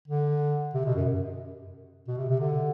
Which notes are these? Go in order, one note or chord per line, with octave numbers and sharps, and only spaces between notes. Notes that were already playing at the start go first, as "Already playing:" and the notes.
D3
C3
B2
F#2
B2
C3
C3
D3